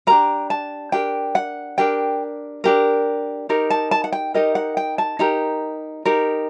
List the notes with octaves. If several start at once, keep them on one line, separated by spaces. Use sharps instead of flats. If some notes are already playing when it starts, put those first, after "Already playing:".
D4 G4 A#4 A#5
A5
D4 G4 A#4 G5
F#5
D4 G4 A#4 G5
D4 G4 A#4
D#4 G4 A#4
A5
A5
F#5
G5
D#4 G4 A#4 D#5
F#5
G5
A5
D#4 G4 A#4 A#5
D#4 G4 A#4